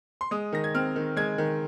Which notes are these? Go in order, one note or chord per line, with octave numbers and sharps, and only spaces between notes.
C6
G#3 D#6
D#3 A#6
G#6
C4 F6
D#3
G#3 G#6
D#3